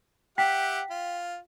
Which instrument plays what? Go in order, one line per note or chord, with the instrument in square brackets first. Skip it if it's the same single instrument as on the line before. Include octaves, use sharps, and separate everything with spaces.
[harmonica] G4 E5 F#5 [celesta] G5 B6
[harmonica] F4